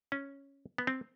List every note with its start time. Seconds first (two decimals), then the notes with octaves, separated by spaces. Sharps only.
0.12 C#4
0.78 B3
0.87 C4